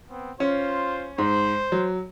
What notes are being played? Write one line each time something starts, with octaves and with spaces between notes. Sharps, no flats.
B3 C4
C#4 F4 C5
G#2 C5
F#3